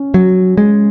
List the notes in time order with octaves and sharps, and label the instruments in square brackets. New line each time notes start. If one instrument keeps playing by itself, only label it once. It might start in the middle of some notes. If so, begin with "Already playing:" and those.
Already playing: [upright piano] C#4
[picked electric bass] F#3
G#3